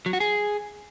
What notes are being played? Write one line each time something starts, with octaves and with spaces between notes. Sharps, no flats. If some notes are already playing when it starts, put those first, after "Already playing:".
F#3
F#4
G#4